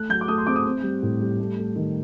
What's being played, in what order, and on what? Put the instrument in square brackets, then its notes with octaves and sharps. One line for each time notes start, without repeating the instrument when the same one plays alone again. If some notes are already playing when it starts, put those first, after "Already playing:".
Already playing: [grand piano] A3 F#6
F#3 G6
D6
A3 D#6
C6
C4 D6
D#6
C4
G3
A2
G3
A3
A3
D#3